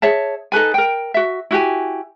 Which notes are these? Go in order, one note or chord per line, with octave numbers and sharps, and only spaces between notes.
G#4 C#5 E5 A5
D#4 A4 B4 G#5
A#4 G5
F#4 E5
E4 F#4 G4 G#5